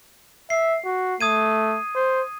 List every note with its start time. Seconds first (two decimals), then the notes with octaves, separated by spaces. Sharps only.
0.50 E5 C7
0.85 F#4
1.21 A3 D#6 G#6 D#7
1.96 C5